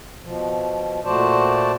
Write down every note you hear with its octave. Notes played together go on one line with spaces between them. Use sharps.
B2 F3
A#2 A3 F#4 C5 D5 A5